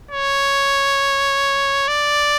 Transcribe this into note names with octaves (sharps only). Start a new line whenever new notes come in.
C#5
D5